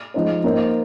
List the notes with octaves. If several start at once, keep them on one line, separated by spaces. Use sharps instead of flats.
F3 G#3 D#4 C5
A#3 D#4 C5